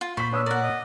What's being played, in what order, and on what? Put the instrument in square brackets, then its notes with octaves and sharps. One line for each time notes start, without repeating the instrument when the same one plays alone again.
[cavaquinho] F4
[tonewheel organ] A#2 [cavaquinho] C5 [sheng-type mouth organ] B5 [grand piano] C#6 B6
[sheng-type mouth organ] D4 B4 [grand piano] C#5 D#6 E6
[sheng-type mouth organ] A#4 [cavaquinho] D5 F#5
[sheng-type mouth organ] D#5